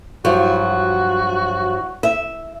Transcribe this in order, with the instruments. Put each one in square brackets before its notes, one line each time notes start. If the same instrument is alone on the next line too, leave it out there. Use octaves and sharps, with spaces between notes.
[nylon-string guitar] G2 F3 F#3 [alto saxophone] F#4
[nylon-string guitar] E5